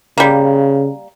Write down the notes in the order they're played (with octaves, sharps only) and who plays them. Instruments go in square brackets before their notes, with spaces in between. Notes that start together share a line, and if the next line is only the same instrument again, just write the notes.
[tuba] C#3 [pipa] G3 A#3